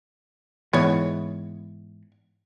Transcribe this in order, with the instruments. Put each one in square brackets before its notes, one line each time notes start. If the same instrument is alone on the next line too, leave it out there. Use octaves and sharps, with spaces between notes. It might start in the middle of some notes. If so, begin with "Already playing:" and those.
[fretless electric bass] G#2 E3 [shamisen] B3 C#5